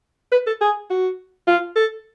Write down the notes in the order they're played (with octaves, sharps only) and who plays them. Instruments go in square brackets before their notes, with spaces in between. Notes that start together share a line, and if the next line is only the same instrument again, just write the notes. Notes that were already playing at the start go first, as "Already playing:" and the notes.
[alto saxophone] B4
A4
G#4
F#4
F4
A4